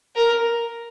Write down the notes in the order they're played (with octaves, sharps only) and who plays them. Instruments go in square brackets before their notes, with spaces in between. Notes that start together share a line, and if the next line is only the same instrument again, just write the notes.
[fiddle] A#4